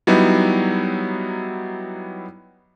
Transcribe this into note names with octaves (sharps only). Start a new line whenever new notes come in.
F#3 G3 B3 D#4 E4